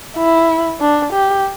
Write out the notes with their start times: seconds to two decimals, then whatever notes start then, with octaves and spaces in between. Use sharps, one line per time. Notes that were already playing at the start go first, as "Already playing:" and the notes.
0.17 E4
0.80 D4
1.13 G4